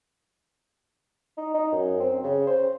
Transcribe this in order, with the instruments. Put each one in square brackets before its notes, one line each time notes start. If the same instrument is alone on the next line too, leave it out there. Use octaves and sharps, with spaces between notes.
[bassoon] D#4
D#4
F#2
C4
C#3
C5